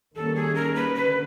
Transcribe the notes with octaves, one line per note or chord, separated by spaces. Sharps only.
D#3 G3 A#3 C#4 A4
G#4
A#4
B4
D3 B4